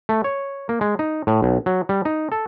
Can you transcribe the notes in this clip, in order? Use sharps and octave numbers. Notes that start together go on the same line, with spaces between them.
A3
C#5
A#3
G#3
D#4
A2
B1
F#3
G3
D#4
A4